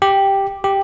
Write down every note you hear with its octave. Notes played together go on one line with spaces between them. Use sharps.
G4
G4